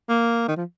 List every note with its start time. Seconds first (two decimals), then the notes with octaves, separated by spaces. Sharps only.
0.09 A#3
0.48 D#3
0.56 F3